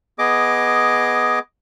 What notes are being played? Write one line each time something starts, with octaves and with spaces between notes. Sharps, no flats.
B3 G#4 D#5 D6